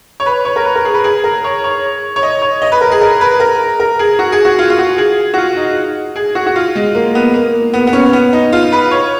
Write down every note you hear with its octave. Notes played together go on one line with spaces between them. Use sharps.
C#5
B4
C#5
A#4
B4
A#4
G#4
B4
G#4
A#4
C#5
C#5
C#5
D#5
C#5
D#5
B4
A#4
G#4
A#4
B4
A#4
A#4
G#4
F#4
G#4
F#4
F4
F4
F#4
G#4
F#4
F4
D#4
G#4
F#4
F#4
F4
G#3
A#3
B3
A#3
B3
B3
C#4
B3
D#4
F4
B4
C#5